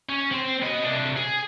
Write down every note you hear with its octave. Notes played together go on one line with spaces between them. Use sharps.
C#4
C4 C5
B3 D#5
C3 D4
G#4